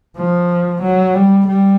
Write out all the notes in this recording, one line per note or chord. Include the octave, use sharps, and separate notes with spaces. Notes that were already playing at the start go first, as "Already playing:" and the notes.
F3
F#3
G3
G3